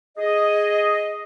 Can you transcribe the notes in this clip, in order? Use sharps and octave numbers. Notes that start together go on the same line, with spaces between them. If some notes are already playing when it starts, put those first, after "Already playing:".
G#4 D#5